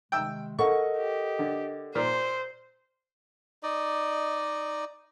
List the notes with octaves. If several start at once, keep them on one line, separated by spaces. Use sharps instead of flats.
C3 D#3 G#3 G5 E6
A4 A#4 D#5 F#5 C#6
G4
D3
A#2 C5
D#4 D5 D#5